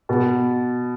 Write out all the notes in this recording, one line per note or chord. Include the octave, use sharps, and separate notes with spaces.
B2